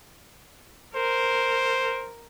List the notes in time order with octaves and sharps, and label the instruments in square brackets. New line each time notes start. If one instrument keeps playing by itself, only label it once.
[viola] A#4 [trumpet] C5